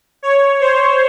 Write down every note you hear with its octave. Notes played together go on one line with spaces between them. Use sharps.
C#5
C5